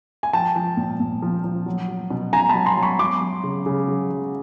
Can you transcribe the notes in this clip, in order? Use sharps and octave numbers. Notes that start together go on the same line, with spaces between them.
G#5
F3 G5 A5
F3
A#2
A#2
F3
F3
F#3
F#3
B2
B2 G#5 A#5
A5 B5
F#3
A#5 C6
F#3
B5 C#6
F#3 C6 D6
F#3
C#3
C#3
F#3
F#3